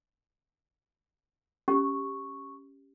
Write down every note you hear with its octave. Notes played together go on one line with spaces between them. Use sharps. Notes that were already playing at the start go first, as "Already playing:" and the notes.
C#4 G4 C#6